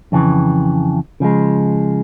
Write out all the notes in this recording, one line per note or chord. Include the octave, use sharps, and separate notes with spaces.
F2 C#3 E3
C#3 F3 G#3